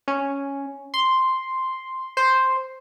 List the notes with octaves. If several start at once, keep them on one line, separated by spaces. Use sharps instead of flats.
C#4
C6
C5